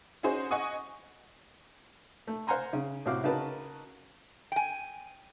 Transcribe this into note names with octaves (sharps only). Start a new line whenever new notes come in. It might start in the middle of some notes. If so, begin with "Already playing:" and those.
C#4 D#4 F#4 G#4 C5
D#5 F#5 G#5 C#6 D#6
A3
C5 F5 F#5 G#5 A#5 C6
C#3
A2 C3 F#4 F5 D6
C#3 D#4 F#4 A#4 B4 A5
G5 G#5